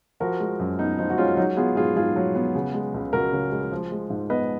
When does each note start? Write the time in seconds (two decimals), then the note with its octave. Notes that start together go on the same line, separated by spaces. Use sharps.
0.20 F3 F#4 A#4
0.40 G#3
0.59 F#2
0.79 B3 D#4
0.99 F3 D#4
1.10 F#4
1.18 G#3 C#4 F4
1.37 F#3 D#4 F#4
1.57 B3 F4 G#4
1.76 G#2 F4 G#4
1.96 G#2 F4 G#4
2.16 F#3
2.36 B3
2.55 C#3
2.74 G#3
2.94 C#2
3.13 C#2 F#4 A#4
3.33 C#3
3.52 G#3
3.72 F3
3.91 G#3
4.10 G#2
4.30 B3 B4 D#5